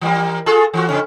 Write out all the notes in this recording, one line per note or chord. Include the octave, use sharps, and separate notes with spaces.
E3 G3 A#3
F4 G#4 A4
E3 F4 F#4
F2 C#3 C#4